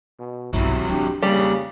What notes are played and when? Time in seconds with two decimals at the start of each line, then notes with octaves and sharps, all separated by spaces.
0.19 B2
0.53 B1 G2 C3 F#3 E4
0.89 D4 E4 G4
1.23 C#3 G3 A#3 G5